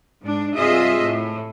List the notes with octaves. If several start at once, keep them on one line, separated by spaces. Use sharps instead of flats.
G#2 D4
G2 C3 F4 G#4 D#5 E5
A2